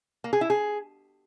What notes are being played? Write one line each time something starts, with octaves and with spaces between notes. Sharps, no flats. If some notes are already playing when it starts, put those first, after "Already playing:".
A#3
G#4
E4
G#4